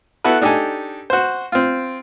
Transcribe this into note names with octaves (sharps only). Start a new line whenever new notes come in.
B3 E4 F#4 A4 B4
D4 D#4 G4 A4 G#5
F#4 C5
C4 F4